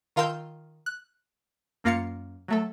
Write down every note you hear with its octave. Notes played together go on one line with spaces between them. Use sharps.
D#3 F4 A#4 C6 E6 G6
F#6
F#2 A#3 F4 F5 A6 C#7
F#3 A3 A4